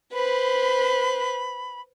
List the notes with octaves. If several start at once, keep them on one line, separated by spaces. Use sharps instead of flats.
B4 C5 B5